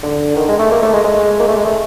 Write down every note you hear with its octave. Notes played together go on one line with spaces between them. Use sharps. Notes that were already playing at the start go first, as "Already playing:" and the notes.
D3
D#3
G#3
A3
A#3
A3
G#3
G#3
A#3
A3
G#3
A3